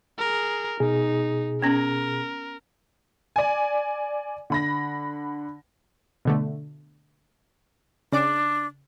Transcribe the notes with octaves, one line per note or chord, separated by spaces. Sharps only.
G#4 A#4
B2 D#4 G#4
B3 C#4 A#4
D5 G#5
D3 B5 A#6
B2 D3 A3
C#3 D4 D5 D6